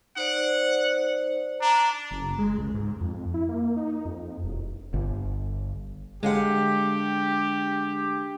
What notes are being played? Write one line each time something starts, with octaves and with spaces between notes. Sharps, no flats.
D#4 C5 D5 F#5
D4 A#5
F#1
G#3
C#2
G#2
F2
E4
A#3
D#4
F2
E1
G1
D3 G#3 G4 F5 F#5